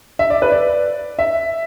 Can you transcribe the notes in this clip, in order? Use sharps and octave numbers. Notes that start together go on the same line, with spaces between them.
E5
D5
B4
D5
E5